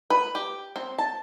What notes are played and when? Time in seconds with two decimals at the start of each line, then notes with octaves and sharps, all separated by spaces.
0.10 B4
0.35 G4
0.76 C4
0.98 A5